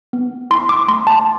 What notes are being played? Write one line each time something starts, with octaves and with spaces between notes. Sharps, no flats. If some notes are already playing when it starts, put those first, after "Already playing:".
B3
E4 C6
D6
A3 C6
A5